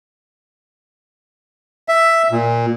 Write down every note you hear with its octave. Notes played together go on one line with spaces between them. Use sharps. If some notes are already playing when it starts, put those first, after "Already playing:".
E5
A#2